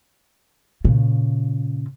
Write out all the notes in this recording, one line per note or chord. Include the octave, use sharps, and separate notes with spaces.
A#2 C#3